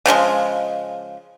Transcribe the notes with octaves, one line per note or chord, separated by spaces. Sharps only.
C#3 F3 F#3 G#3